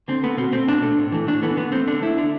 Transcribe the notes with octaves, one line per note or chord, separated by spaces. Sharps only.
D3 C4
A3 B3
B2 C4
A3 C4
B2 D4
A3
A2
E3 A3
A2 D4
E3 A3 B3
D3 B3
A3 C4
D3 D4
A3 E4
D3 D4